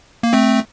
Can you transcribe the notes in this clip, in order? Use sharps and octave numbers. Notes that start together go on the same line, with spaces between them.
A#3
A3 C4